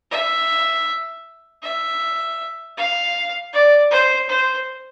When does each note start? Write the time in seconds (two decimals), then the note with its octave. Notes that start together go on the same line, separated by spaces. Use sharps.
0.11 E5
1.63 E5
2.77 F5
3.53 D5
3.91 C5
4.29 C5